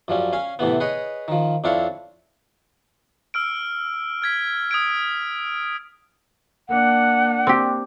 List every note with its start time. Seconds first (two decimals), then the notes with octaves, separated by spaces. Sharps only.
0.08 F#2 F3 G3 C#4
0.33 C#4 F5 G#5
0.59 A2 C3 E3 B3
0.80 G#4 B4 C#5 D#5
1.28 D#3 F3
1.64 F2 C4 D4 E4 C#5 F5
3.34 E6 F6 D7
4.22 F6 G#6 B6
4.71 D#6 G#6 D7
6.69 A#3 D4 F#5
7.47 C4 G4